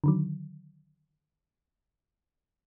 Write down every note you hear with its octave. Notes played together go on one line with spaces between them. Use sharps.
D3 D#3 F#3